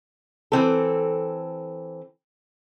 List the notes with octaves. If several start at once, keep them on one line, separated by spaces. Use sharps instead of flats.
E3 C4 A4